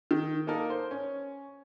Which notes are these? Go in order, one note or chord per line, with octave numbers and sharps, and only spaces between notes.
D#3
A#3 D#4 A4 A#4
C5
C#4